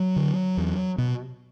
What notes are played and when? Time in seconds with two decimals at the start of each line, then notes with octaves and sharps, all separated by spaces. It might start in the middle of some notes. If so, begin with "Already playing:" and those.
Already playing: F#3
0.16 D3
0.57 E2
0.98 B2